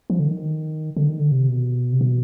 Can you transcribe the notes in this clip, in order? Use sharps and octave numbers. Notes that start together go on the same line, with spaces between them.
F3
D3
D#3
D3
D#3
D3
C3
B2
C3
B2